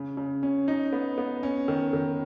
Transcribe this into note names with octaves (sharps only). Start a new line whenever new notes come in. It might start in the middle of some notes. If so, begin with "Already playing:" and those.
Already playing: C#3
C#3
C#4
D#4
B3
B3
C#4
D#3
D#3